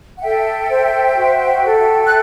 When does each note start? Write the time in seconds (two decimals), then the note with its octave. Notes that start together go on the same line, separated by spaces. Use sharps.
0.17 F#5
0.23 A4 E5 G5
0.69 C5
1.17 F#4
1.64 A4
2.06 F#6